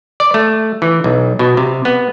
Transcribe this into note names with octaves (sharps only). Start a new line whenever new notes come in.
D5
A3
E3
B1
B2
C3
B3